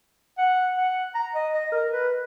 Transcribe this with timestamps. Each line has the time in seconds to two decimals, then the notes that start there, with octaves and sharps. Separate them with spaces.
0.38 F#5
0.77 F#5
1.14 A#5
1.35 D#5
1.54 D#5
1.72 A#4
1.91 B4